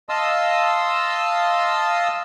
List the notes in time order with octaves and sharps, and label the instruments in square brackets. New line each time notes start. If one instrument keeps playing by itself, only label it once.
[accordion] D#5 F5 A5 C6 D#6 E6